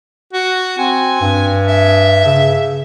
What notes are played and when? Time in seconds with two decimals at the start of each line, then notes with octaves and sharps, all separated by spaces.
0.33 F#4
0.78 C4 G#5
1.21 G2
1.67 E5
2.25 C#3